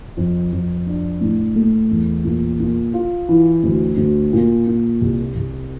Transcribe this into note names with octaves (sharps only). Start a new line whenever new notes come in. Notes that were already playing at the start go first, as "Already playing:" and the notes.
F2
F2
D4
A2
A3
E2
A#2
A#2
F4
E3
D2
D2
A#2
A#2
C2
C2